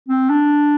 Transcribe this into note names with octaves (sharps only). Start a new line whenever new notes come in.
C4
D4